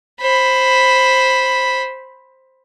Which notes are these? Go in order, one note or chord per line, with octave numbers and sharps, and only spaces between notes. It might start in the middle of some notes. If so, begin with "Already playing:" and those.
C5 B5